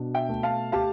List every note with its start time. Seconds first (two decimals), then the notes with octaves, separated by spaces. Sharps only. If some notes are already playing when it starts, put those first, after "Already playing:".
Already playing: B2 D4
0.14 E5 G5
0.29 A3
0.43 F5 A5
0.72 G4 F5 A5